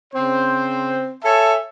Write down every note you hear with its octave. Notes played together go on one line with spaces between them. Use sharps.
C#3 C4 C5
A4 C#5 E5 G#5 A5